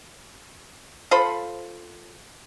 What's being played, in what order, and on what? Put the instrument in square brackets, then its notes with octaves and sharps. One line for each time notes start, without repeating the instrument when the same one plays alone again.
[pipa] F4 A4 C5 B5